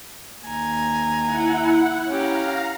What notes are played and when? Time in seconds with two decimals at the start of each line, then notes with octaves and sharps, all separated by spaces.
0.47 D#2 G#5 A#5
1.23 E4 F#5
2.08 C#4 G4 F5 A#5